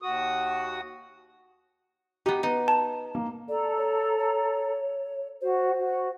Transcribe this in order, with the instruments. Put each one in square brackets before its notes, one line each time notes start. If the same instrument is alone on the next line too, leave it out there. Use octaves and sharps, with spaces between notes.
[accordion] D#2 F#4 D#6
[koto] B3 D#4 [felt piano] G4
[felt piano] B3 [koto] D#4
[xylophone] A5
[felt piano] A#3
[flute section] A4 A#5 [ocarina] D5
[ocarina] C#5
C#5
[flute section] F#4 [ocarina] C5
[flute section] F#4